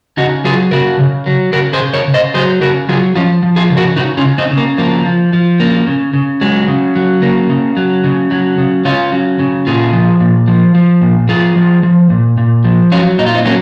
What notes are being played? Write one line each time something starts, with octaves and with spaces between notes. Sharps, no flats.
C#3 D#4 F#4
F#3 F4 G#4
C#3 F#4 A#4
C#3
F#3
C#3 F#4 A#4
G#4 C5
C#3
A#4 C#5
C#3
C5 D#5
F#3 G#4 C5
C#3 F#4 A#4
F#3 F4 G#4
F3 C#4 F4
F3
F4 G#4
C#3
F#4 A#4
C#3 D#4 F#4
C#4 F4
C#3
C4 D#4
C#3
A#3
F3 A#3
F3
F3
C#3 A#3
C#3
C#3
F#3 G#3
C#3
F#3
C#3 A#3
C#3
F#3
C#3
F#3
C#3
C#3 C#4 F4
F#3
C#3
A#2 F4 G#4
F3
A#2
F3
F3
A#2
F3 F4 G#4
F3
F3
A#2
A#2
F3
F#3 C#4 F4
A#2 D#4
F4
C4 D#4
F#3 A#3 C#4